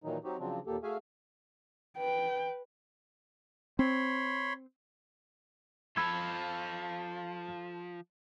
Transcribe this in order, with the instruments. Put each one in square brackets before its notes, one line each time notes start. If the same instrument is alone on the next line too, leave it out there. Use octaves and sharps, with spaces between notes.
[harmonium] A#2 D#3 E3 F#3 D#4
F#3 C4 D#4 F#4 G4
C#3 F3 F#3 C4 D4
D#2 A#2 A#3 G4 A4
A3 F#4 G#4 E5 F5 G#5
[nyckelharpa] B4 [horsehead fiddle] G5
[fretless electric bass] C4 [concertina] C#5 B5 C6
[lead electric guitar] F3 [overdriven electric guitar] F4 A4 [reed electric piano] B5 E6 G#6